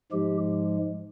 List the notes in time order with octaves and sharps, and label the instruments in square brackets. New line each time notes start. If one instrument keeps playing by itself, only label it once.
[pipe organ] G#2 F3 G#3 G4